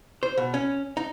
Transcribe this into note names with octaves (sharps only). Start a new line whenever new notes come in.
C5
B2
C#4
D#4